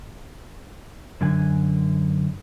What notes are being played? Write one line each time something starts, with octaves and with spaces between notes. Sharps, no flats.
F#2 D3 G#5